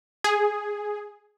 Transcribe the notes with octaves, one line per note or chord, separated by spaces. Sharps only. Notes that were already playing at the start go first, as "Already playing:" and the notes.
G#4